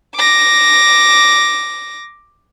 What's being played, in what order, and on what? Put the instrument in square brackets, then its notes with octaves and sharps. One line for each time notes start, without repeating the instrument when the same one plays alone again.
[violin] D6 A#6